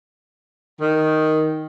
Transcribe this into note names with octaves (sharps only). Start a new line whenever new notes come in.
D#3